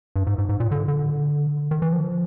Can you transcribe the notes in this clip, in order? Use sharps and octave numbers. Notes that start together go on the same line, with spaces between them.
G2
G#2
G#2
G#2
A#2
D3
D3
D#3
E3
F3